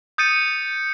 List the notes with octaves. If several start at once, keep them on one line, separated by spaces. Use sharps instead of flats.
D#6 G6 A6 C#7 D#7